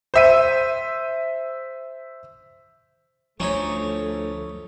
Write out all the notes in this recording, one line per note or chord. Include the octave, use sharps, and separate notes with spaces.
C5 E5 D#7
D2 F3 A3 C#4 D#4 C#5